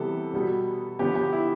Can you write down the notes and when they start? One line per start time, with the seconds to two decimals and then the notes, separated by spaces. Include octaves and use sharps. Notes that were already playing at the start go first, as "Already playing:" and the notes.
Already playing: C3 E3 G3 B3 A4
0.33 B2 G3 B3
0.99 D3 F3 B3 G4
1.15 G4
1.33 E4